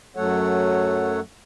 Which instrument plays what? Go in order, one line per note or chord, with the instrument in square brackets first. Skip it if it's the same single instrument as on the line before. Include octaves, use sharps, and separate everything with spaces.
[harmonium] F#2 F#3 A3 A4 C#5 F#5